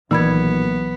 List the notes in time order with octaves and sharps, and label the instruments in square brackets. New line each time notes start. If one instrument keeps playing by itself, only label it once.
[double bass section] B1 [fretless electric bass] A#2 D#3 [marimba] E3 B5 G#6 [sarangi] B3